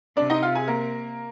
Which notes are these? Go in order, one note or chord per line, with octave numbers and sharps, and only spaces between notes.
C3 D4 D5
D#4 D#5
F4 F5
G#4 G#5
A#3 A#4